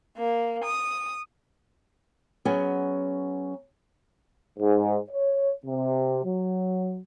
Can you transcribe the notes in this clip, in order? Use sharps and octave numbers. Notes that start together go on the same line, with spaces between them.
A#3
D#6
F#3 B3 C#4 G#4 G#5
G#2
C#5
C3
F#3